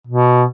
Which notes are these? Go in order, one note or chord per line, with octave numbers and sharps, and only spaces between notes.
B2